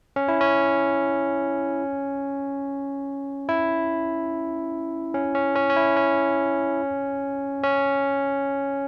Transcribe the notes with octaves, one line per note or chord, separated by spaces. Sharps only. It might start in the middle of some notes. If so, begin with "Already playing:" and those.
C#4
E4
C#4
E4
C#4
C#4
C#4
C#4
E4
C#4
C#4